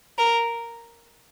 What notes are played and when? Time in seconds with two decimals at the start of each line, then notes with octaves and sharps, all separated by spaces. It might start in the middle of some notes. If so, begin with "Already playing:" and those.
0.19 A#4